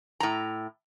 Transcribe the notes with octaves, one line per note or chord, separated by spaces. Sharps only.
A2 A#5